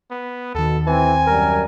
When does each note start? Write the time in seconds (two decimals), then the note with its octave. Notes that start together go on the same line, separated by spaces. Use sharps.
0.11 B3
0.55 D#2 B2 D#3 A4
0.87 E3 C4 G#5
1.27 F#2 G3 A#4